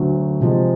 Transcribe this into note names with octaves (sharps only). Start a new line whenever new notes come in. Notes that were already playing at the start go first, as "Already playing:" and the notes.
Already playing: D2 D3 F#3
C3 F3 G#3